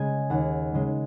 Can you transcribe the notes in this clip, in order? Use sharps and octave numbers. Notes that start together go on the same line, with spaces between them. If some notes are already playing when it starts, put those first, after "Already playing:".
Already playing: C#3 G#3 G#5
D#2 F#5
C#3 G#3